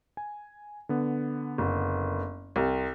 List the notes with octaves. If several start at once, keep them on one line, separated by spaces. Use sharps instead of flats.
G#5
D3 B3
F#1
C2